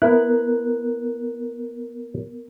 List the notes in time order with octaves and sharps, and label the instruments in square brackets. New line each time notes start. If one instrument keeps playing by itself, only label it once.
[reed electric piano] B3 A#4 F#6 [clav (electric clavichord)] E4